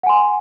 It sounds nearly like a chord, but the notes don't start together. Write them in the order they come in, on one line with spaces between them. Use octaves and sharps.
F#5 G#5 C6